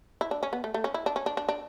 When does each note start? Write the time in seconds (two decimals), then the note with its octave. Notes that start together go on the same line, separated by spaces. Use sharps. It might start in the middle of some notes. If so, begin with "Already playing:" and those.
0.21 E4
0.31 D4
0.43 C#4
0.53 B3
0.64 A3
0.74 A3
0.84 C#4
0.94 E4
1.06 D4
1.16 C#4
1.26 D4
1.37 D4
1.49 D4